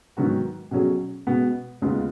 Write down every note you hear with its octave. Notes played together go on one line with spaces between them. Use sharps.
G#2 D#3 F#3 B3 F#4
B2 F#3 C#4 G#4
B2 G#3 B3
D#2 C#3 G#3 B3 F4